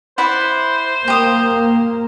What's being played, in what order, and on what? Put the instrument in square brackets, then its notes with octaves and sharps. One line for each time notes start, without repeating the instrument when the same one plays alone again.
[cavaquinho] E4 D5 F#5 [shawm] C5
[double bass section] A#3 [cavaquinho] G4 D#6